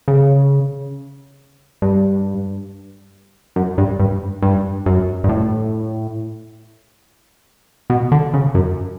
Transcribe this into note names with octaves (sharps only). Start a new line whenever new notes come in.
C#3
G2
F#2
G2
G2
G2
F#2
G2
A2
B2
D3
C#3
F#2